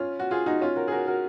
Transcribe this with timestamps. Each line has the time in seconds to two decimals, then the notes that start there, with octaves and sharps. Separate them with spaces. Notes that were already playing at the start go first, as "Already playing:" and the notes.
Already playing: C#4 F4
0.20 F#4
0.31 F4 G#4
0.46 D#4 F#4
0.61 C#4 F4
0.76 F#4 A#4
0.88 G#4
0.91 F#4 A#4
1.07 F#4 A#4